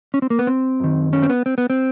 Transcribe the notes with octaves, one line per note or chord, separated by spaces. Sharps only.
C#4
C4
A#3
B3
C4
F#2 D#3
C#4
C4
B3
C4
B3
C4